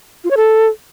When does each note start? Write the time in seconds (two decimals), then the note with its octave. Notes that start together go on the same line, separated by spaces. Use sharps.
0.24 F4
0.31 C#5
0.37 A4